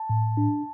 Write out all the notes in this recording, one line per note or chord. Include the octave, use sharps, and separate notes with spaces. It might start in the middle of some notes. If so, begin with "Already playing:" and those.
Already playing: A5
A2
D4